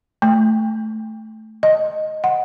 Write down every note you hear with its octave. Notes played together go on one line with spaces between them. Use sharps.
A3
D#5
F#5